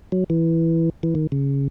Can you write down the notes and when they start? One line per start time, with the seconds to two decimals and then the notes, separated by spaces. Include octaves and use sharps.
0.12 F#3
0.30 E3
1.03 E3
1.15 D#3
1.32 C#3